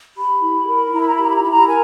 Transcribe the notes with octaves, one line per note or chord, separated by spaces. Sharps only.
G4 B5
E4
A#4
E4 A#5
B5
A#5
B5
G4 A#5
B5
A#5
E4 B5
A#5
A#4 G#5